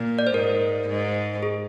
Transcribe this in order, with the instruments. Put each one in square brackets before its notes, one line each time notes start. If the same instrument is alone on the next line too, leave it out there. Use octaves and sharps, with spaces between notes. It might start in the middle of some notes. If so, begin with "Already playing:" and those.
Already playing: [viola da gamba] A#2
[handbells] D5
C5
[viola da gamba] G#2 [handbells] A#4
[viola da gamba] G#2
[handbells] G#4